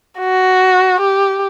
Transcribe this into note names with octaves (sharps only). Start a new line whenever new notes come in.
F#4
G4